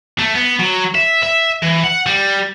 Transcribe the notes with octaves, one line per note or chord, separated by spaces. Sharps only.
A3
B3
F#3
E5
E5
E3
F#5
G3